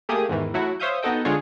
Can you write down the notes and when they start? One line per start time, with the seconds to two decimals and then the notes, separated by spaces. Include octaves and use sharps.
0.09 A3 A#3 G4 G#4 D#6
0.29 E2 G#2 D#3 E3
0.54 F#3 A3 E4 F#4
0.80 C5 C#5 E5 F5 D#6 G6
1.03 B3 D#4 F#4 A4 D#5 G5
1.25 D3 G#3 D4 F4 G#4 C#5